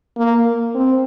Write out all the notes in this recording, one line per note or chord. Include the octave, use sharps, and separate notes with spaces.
A#3
C4